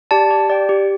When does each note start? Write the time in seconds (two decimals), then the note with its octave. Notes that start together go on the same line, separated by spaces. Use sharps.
0.11 G4 D5 A5
0.30 G4
0.50 D5 G5
0.69 G4